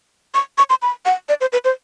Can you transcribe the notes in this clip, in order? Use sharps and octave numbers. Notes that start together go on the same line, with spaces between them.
C#6
C#6
C6
B5
F#5
D5
C5
B4
C5